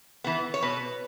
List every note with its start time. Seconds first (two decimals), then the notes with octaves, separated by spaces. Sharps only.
0.24 E3 B3
0.54 C#5
0.62 B2 B4